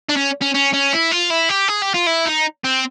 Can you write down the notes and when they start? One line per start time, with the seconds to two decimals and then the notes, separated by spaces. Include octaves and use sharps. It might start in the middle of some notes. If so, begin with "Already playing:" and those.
0.09 D4
0.17 C#4
0.42 C#4
0.55 C#4
0.74 C#4
0.93 E4
1.12 F4
1.31 E4
1.49 G4
1.69 G#4
1.82 G4
1.94 F4
2.07 E4
2.25 D#4
2.64 C4